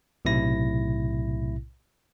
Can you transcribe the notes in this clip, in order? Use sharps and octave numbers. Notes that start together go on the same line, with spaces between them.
B1 A2 C3 E4 A#6